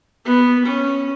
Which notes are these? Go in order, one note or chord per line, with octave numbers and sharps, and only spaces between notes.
B3
C#4